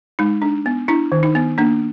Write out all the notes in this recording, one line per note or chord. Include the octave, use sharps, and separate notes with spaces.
G#3 D#4
D4
B3
D4 E4
D#3
D#4
B3
A#3 D4